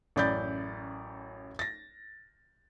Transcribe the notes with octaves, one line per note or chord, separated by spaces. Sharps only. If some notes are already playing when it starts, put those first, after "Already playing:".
A1 F#2 D5 B5 G6 A6
A6 A#6